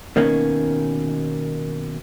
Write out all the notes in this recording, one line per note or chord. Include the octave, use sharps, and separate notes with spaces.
B2 D#3 A#3 C#4